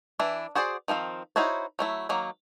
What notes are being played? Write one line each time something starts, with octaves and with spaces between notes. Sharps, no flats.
E3 D4 E4
F#4 G#4 C5 D5
D#3 F3 C4 F5
D#4 E4 F#4 C5 C#5
F#3 A3 E4
D#3 F#3 A#3